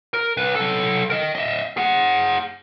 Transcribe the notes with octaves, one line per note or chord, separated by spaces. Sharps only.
A#4
C2 B4
F#3 A4
A#4 D#5
D#5 E5
G#4 F#5